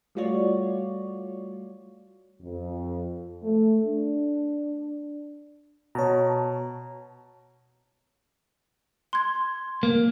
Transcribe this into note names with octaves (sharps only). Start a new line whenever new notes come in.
G3 A3 F4 F#4 C#5 D5
F2
A3
D4
B2 C#5 A5 A#5
C6 G#6
A#3